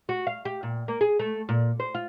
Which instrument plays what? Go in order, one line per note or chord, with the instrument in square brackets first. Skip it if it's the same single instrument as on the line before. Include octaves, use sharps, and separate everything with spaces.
[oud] F#4
F5
G4
A#2
A#3
G#4
A3
A#2
C5
F4